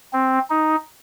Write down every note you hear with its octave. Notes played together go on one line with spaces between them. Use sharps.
C4
D#4